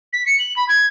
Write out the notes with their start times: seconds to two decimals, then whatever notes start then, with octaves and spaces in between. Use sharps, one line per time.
0.13 B6
0.26 C#7
0.39 F#7
0.56 B5
0.69 G#6